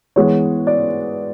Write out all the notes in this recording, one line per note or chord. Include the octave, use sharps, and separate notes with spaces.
E3 G#3 B3 C#5
D5